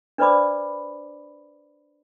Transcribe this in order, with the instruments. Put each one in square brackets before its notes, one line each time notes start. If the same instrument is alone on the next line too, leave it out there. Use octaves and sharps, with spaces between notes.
[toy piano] D4 B4 C5 D5 B5 D6